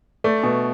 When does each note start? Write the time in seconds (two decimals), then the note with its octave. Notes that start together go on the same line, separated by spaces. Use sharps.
0.24 A3 D5
0.43 B2